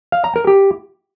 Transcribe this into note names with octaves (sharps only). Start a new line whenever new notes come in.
F5
A#5
A#4
G4